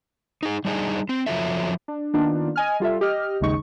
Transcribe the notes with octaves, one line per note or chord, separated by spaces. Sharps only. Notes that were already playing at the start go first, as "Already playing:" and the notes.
D#4 G#4
G3 D4 D#4 G#4
C4
F2 F3 F#3 E4 A4 E5
D4
D#3 A#3 B3 D4 D#4 F4
D#5 G#5 F6
G3 F4 A4 E5
G4 D#5 F6
G#1 D#2 C#3 G#3 D#4 C#6